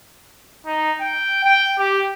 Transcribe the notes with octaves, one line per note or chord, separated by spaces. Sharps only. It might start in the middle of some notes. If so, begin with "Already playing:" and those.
D#4
G5
G5
G4